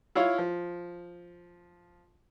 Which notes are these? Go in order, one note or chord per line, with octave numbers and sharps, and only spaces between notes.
E4 F4 C#5 F5
F3